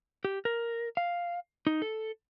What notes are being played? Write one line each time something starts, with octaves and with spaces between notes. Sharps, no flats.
G4
A#4
F5
D#4
A4